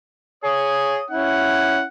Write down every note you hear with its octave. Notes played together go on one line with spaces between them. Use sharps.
G#4 C#5 D#6
C#4 E4 F#5